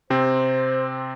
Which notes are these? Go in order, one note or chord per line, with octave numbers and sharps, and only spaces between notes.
C3 C4 C5